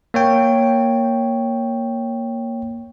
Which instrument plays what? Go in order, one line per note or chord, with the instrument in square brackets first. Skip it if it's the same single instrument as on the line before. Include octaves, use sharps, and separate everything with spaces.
[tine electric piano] A#3 C#5 G5